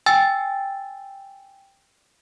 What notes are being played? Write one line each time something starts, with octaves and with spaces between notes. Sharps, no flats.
G5 G#5 E6 A6